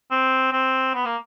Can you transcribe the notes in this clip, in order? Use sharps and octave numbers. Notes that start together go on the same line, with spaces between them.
C4
C4
B3
A#3